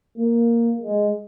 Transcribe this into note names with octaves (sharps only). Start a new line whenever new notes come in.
A#3
G#3